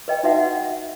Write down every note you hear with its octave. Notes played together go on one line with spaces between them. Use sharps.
B4 D#5 G5
D#4 F#4 B4 E5 F#5